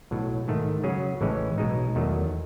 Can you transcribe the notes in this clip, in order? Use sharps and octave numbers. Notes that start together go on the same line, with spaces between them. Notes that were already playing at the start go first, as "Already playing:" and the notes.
B1 A2 F#3
G#2 D#3 A3
C#3 F#3 C#4 G#4
A1 A2 E3 G#3 C#4
B1 B2 G#3 D#4
E2 D#3 F#3 A3